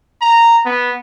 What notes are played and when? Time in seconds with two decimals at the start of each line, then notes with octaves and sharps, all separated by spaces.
0.22 A#5
0.65 B3